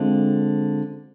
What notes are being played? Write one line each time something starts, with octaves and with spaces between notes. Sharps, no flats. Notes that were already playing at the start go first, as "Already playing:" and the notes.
Already playing: D3 G#3 C4 F4